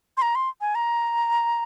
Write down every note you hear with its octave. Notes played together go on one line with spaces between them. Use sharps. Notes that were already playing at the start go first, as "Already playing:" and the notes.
C6
A#5
C6
G#5
A#5